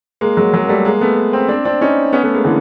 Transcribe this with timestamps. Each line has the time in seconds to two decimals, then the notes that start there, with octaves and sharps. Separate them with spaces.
0.21 G#3 A#3
0.37 F#3 G#3
0.54 F#3 G#3
0.64 A#3
0.69 G3 A3
0.85 G#3 A#3
1.01 A3 B3
1.33 A#3 C4
1.49 C4 D4
1.65 C4 D4
1.81 C#4 D#4
2.13 B3 C#4
2.23 A3 B3
2.34 G#3 A#3
2.44 D3 E3